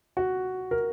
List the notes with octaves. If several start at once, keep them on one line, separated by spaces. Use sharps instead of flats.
F#4
A#4